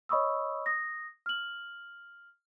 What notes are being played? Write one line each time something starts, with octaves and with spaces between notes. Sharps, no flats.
C#5 D#5 B5 C#6 D#6 E6
D#6 A#6
F6 F#7